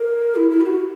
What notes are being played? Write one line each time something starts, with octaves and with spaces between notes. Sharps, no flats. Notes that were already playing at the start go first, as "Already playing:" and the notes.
Already playing: A#4
E4
E4
G4
F#4